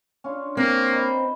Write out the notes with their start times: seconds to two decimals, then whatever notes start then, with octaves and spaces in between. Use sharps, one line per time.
0.24 C#4 D4 F4
0.57 A#3 C4
0.92 D#4 B4